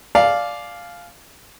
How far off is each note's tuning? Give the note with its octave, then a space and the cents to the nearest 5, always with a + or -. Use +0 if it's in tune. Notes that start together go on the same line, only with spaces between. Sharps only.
D5 +0 F5 +0 G#5 +40